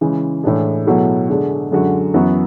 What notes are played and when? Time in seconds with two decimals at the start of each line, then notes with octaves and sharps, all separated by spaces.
0.01 C#3 E3 G#3
0.43 A2 E3 G#3 D4 G#4
0.86 B2 F#3 A3 E4 G#4
1.29 D3 G#3 D4 G#4
1.72 F#2 D3 G#3 D4 F#4
2.14 F#2 E3 B3 F#4